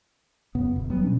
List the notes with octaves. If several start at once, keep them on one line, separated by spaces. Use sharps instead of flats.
F#2 C#3 B3
D#1
F#3 G3 B3
B2 C#4 D4